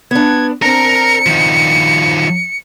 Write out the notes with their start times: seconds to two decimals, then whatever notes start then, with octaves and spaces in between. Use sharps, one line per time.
0.11 B3 D4 G#6
0.62 C4 D4 A#4 A#5 C#7
1.26 D#3 F3